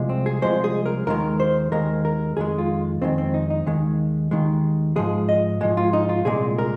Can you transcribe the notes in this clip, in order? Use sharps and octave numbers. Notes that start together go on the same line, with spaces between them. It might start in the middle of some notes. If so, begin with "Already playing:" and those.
Already playing: C2 C3 F3 G#3
C4
G#4
C2 C3 F3 G#3 C5
G#4
A#4
D#2 D#3 G#3 A#4
C5
D#2 D#3 G#3 A#4
A#4
F2 D#3 G#3 G#4
F4
F2 D#3 G#3 C4
C4
D#4
D#4
D#2 D#3 G#3
D#2 D#3 G#3
G#2 F3 G#3 G#4
D#5
G#2 F3 G#3
F4
D#4
F4
C2 A#2 G#3 G#4
A#4